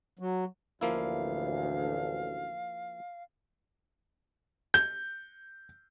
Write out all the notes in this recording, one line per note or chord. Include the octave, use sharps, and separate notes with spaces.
F#3
A1 D2 F3 A#3 E4 F5
G6